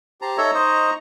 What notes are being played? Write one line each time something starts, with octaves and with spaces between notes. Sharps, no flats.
G4 C5 A5 A#5
D#4 A4 C#5 E5 A#5 C#6
C5 D#5